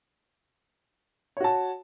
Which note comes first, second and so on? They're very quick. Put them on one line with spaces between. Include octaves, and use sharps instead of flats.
C#5 F#4 A5